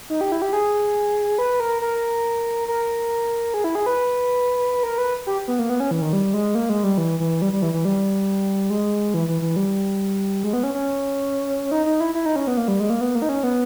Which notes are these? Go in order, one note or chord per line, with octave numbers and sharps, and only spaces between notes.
D#4
G4
E4
G4
G#4
B4
A#4
A#4
A#4
G#4
E4
G#4
B4
A#4
B4
G4
B3
A#3
B3
C#4
E3
D#3
G3
G#3
A#3
G#3
G3
E3
E3
G3
G3
E3
E3
G3
G#3
E3
E3
E3
G3
G#3
B3
C#4
C#4
D#4
D#4
E4
E4
D#4
C#4
B3
A#3
G3
G#3
A#3
B3
A#3
D#4
C#4
B3